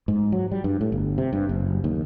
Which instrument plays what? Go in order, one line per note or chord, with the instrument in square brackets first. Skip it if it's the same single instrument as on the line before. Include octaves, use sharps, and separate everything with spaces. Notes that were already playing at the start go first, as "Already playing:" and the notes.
[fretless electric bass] G#2
F#3
G3
G2
A2
G1
C3
G2
F#1
D#2